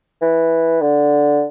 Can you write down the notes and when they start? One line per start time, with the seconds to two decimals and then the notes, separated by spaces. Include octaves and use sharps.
0.21 E3
0.81 D3